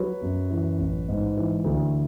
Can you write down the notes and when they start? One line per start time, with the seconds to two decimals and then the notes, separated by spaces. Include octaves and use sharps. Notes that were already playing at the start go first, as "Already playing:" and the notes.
Already playing: F#3 B4 C#5
0.22 F#2
0.51 E3
0.79 A1
1.08 G#2
1.37 E3
1.64 D2